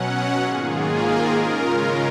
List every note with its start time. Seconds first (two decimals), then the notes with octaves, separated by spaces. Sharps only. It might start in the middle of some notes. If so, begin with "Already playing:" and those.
Already playing: B2 F#3 C#4 F#5
0.42 G#2 D#3 A#3 F4 G#4
0.89 A#4
1.36 C#3 G#3 C#4 F4